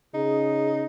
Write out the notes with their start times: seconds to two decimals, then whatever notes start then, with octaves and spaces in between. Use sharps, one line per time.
0.14 C#3 D#4 G#4